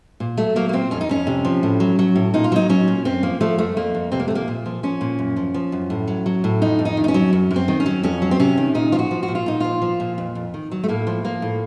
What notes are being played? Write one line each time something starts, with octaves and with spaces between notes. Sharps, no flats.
A#2
F#3 A3
F#3 A#3
A#3
A#2 C4
F2 C#4
D#4
F2 C#4
C3
F3
A2
F#3
F#3
A2
A#2 D#4
F4
F#3 D#4
F#3 C#4
A#2
F#2 C4
F3 A#3
F3 A3
F#2 A3
F2 A#3
F2
C3 C4
A#3
A3
F3 A#3
A#2
F3
F3 C#4
A#2
F#2
F3
F3
F#2
A2
F#3
F#3
A2
F2 D#4
F2
D#4
D#3
D#4
C#4
F#3
F#2
F#2
C4
D#3
C#4
F#3
F2 C#4
F#3
C4
C3 C#4
D#3
A#2 D#4
F3 F4
F#4
F3
F#4
A#2
F4
A#2 D#4
F3 F4
F3
A#2
F2
F2
D#3
F#3
A3
A2 A#3
F3
F3 A#3
A2